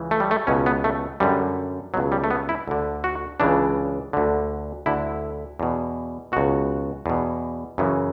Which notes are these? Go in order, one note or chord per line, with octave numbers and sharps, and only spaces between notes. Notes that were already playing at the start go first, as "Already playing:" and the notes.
Already playing: C#2 C#3 E3
A3
G3
A3
C#2 B2 C#4
B3
A3
F#2 D3 G3
C#2 B2 F#3
G3
A3
B3
E4
D2 D3
F#4
C#2 C#3 E3 D4
D2 D3
D2 D3 E4
E2 B2
C#2 B2 F#4
E2 B2
F#2 C#3 E3